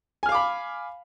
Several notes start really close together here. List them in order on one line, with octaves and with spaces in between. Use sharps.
G#5 F6 F5 D6 B5